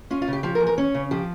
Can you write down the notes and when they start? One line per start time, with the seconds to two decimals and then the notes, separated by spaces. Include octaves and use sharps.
0.10 C#4 F4
0.22 F4
0.28 C#3
0.33 G4
0.43 F3 G4
0.55 A#4
0.61 E2
0.67 A#4
0.78 C#4 C#5
0.94 C#3
1.11 F3 G4